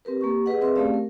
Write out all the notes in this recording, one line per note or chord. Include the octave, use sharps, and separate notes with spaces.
C4 G4 A#4 B4
A#3 G4 C#6
G#4 B4 D#5 F#5
C4 G#4 A#4 B4 E5 C6
A3 C4 C#4 G4 D5 F5
A#4